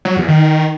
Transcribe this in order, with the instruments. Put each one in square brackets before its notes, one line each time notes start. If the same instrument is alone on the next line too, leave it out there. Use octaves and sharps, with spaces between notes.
[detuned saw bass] F#3
E2
D#3